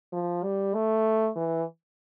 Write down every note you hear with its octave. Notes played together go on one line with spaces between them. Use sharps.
F3
G3
A3
E3